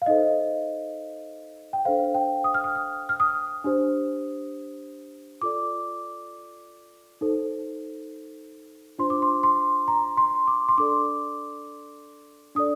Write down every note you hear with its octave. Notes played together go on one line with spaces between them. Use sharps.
F5
D#4 A4 C5 D#5
G5
D4 A4 C5 F5
G5
D#6
F6
D#6
F6
F6
D#6
D4 G4 C5
F4 A4 D5 D6
D#4 A4 C5
D4 F4 C5 C6
D6
C6
C6
A#5
C6
D6
C6
D4 A4 D5 D6
D4 A4 D5 D#6